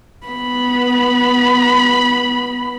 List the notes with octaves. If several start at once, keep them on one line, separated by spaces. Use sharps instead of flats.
B3 B5